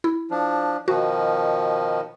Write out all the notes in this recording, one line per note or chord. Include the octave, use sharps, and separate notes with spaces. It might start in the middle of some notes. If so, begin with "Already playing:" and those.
E4
F3 D4
B2 D#3 F3 F#4